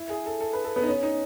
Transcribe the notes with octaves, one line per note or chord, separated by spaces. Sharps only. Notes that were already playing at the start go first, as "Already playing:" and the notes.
Already playing: E4
G#4
A4
A4
B4
A4
B3
D#4
C#4
D#4